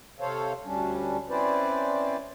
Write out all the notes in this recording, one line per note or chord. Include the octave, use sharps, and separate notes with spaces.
C3 A4 C5 C#5 F5
D2 G3 C#4 D4
C4 C#4 E4 B4 C5 D5